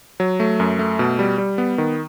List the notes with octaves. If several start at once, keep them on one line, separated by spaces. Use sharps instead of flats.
F#3
A3
F#2
A3
B2
G3
G3
B3
D#3